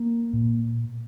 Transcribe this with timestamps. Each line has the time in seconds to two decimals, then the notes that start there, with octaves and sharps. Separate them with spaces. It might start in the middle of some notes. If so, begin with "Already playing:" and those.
Already playing: A#3
0.33 A#2